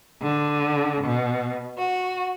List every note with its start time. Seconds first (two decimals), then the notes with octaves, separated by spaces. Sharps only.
0.21 D3
1.04 B2
1.79 F#4